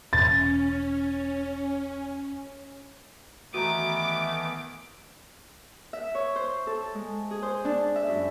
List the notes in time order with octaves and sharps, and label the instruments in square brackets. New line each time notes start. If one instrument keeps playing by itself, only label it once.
[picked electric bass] E1 [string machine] C#4 [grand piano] A6
[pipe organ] D#3 E3 B3 [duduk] A3 [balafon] F#4 A#5 [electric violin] D6
[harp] E5
C#5
C5
A4
G#3
G#4
C5
D4
E5
F#2